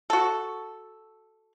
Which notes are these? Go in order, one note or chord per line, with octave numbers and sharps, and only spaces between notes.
F#4 A4